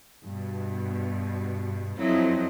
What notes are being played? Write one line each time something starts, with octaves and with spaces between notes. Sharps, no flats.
G2 B2
F2 F#3 C4 E4 D#5